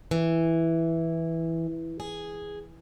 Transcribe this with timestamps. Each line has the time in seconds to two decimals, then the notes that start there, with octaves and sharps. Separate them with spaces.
0.11 E3
2.00 G#4